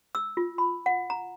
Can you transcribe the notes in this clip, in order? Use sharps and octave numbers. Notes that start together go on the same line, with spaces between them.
E6
F4
B5
F#5
A#5